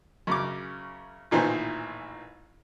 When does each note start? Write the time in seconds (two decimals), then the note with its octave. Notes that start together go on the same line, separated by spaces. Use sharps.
0.27 F#2 C#3 D6
1.31 A1 A#2 D#3 E3 C5 G#5